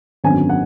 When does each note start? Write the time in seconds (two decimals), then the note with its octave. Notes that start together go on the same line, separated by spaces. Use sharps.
0.24 G#1 F#2 D3 F#3 B3 G#5
0.49 F#5